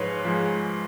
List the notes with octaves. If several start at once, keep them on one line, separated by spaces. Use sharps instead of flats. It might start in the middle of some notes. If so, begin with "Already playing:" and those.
Already playing: G#2 F3 G#3 B4 C#5
F3 G#3